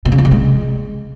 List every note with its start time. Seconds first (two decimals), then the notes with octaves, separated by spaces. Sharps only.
0.05 B2
0.12 C#3
0.18 F3
0.25 C3
0.31 G#3